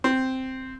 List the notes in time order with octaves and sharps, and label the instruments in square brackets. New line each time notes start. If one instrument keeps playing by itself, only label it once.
[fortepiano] C4